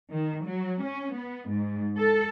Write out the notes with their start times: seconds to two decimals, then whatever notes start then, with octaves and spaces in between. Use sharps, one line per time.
0.11 D#3
0.45 F#3
0.82 C#4
1.15 B3
1.48 G#2
1.97 A4